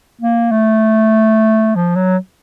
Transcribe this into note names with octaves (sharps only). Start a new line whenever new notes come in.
A#3
A3
F3
F#3